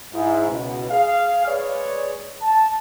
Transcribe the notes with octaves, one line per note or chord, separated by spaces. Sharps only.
G#2 E4
C#2 B2
G#4 F5
G#3 G#4 B4 C#5 D5
A5